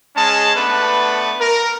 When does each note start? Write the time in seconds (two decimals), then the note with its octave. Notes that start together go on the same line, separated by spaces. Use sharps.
0.15 G#3 C#4 G#4 A5
0.56 A3 B3 D4 B4
1.40 A#4